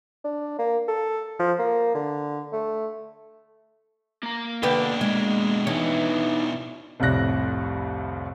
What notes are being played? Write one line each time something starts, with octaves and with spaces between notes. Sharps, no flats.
D4
A#3
A4
F3
A#3
D3
A3
A#3 A#5
B2 D3 B3 D4 G4
G#3
E3 D#4 C#5
C2 F2 A2 D5 F#6 A#6